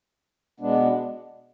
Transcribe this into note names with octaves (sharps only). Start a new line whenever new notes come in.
B2 G#3 B3 D4